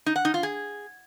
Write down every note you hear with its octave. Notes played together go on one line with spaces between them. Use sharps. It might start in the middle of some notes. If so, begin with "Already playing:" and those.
D#4
F#5
D#4
F4
G#4